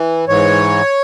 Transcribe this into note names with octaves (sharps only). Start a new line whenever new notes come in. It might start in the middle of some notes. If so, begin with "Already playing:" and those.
Already playing: E3
G#2 E3 C#5